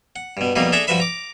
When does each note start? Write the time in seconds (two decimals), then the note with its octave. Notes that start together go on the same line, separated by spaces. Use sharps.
0.16 F#5
0.37 G2 B2
0.56 F2 B2 G3 A#3 D#4 F4
0.72 D4 G#4 A4 E5 A#5
0.87 G2 F3 F#4 B4 E5 B5
1.00 A#5 D6